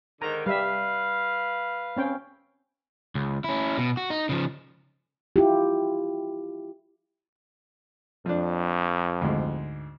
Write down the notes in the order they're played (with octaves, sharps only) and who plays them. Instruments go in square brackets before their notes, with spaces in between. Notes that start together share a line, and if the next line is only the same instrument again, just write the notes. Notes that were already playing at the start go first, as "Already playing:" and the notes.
[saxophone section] G#2 D3 D#3 [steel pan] A#5
[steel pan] G3 E5 [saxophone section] B4 F5
[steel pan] C4 C#4 G5
[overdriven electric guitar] C#2
C#4 E4
B2
F#4
D#4
C#3 F3
[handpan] E4 F4 G4
[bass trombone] F2 [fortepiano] F3 D4
[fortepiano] D2 G#2